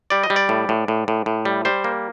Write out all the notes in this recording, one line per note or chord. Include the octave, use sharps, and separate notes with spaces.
G3 D5
D#5
G3
D5
A2
A2
A2
A2
A2
G3
G3 C5
A#3